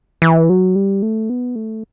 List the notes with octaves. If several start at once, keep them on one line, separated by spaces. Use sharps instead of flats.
E3
F#3
G3
A3
B3
A3